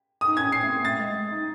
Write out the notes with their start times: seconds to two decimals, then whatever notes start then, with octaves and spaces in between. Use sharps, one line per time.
0.21 D#6
0.28 D#4
0.37 C#4 G#6
0.52 C#4 C7
0.62 A3
0.68 C4
0.84 A3 A6
1.00 G#3
1.16 G#3
1.32 D#4